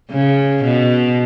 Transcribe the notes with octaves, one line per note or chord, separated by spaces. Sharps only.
C#3
B2